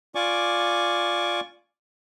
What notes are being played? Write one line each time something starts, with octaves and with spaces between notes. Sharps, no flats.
F4 D5 G#5 C#6 D6